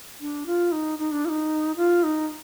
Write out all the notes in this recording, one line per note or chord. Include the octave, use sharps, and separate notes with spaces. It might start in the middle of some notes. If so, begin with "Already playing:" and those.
D4
F4
D#4
D#4
D4
F4
D#4
F4
D#4